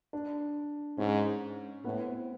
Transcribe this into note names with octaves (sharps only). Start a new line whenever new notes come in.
D4
G#2 C#4
A2 B3
C4